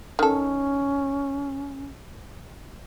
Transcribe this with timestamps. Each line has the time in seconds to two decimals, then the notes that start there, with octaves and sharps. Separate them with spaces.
0.19 D#3 C#4 A4